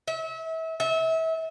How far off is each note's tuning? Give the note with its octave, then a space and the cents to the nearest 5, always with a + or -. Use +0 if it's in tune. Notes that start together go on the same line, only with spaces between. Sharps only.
E5 -30
E5 -30